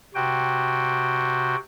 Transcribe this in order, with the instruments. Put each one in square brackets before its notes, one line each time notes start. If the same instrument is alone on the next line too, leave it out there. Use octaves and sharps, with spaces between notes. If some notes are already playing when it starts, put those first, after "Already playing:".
[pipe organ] C3 F#4 G5